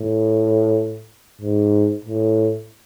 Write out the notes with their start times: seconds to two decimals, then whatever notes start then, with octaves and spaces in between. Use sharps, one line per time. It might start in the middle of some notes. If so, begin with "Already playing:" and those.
Already playing: A2
1.41 G#2
2.05 A2